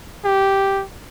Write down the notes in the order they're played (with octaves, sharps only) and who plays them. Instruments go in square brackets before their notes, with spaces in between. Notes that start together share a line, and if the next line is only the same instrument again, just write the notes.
[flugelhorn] G4